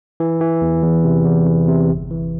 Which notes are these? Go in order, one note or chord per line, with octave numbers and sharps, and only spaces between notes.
E3
E3
E2
E2
C3
E2
E2
C3
G1
E3